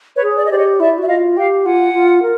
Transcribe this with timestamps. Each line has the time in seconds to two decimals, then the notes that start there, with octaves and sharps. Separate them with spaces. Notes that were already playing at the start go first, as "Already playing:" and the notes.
0.15 B4 C#5
0.22 G#4
0.37 D5
0.44 D#5
0.50 G4 C5 D5
0.58 C#5 D#5
0.80 E4 D5 E5
0.98 F#4 E5
1.08 F4 D#5 F5
1.36 G4 F5 G5
1.65 F4 F#5 G#5
1.94 F4
2.22 A#4